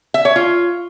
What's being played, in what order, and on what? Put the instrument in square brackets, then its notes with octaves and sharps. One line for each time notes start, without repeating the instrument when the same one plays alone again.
[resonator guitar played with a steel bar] E5
C#5
F4